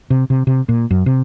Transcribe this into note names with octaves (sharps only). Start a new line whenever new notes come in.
C3
C3
C3
A#2
F#2
C3